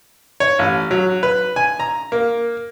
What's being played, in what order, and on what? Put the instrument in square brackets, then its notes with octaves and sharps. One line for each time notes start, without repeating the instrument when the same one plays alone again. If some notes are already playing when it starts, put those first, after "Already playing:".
[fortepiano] C#5
A1
F#3
B4
G#5
A#5
A#3